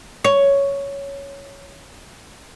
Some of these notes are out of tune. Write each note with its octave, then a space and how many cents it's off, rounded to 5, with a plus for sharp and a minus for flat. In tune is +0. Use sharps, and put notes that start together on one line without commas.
C#5 +5